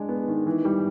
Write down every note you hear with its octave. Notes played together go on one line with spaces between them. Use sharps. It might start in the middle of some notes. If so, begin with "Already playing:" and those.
Already playing: G#3 D4
B3
D#3
E3
G3